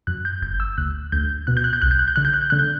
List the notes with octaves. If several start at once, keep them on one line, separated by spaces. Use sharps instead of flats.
F#2 F#6
G6
G1 G6
E6
D2 F#6
D2 G6
B2 F#6
G6
F#6
G6
C2 F#6
G6
F#6
G6
D3 F#6
G6
F#6
G6
D3 F#6
G6